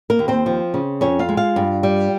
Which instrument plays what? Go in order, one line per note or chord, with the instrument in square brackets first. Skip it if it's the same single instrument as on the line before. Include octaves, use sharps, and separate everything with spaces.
[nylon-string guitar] A#3 A#4
D#2
C4 C5
F3
C#3
F2 C#4 C#5
F4 F5
G#3
F4 F5
G2
G3